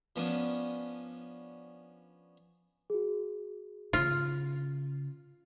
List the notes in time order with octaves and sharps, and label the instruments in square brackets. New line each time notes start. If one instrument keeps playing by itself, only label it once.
[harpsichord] F3 B3 C#4 D4 D#6
[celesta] F#4 G#4
[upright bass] C#3 [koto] F4